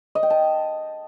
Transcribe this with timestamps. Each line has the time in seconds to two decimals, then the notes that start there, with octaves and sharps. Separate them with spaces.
0.15 D#5
0.23 G5
0.30 A5